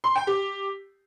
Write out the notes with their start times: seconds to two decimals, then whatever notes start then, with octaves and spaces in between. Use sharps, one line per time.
0.04 C6
0.16 G5
0.27 G4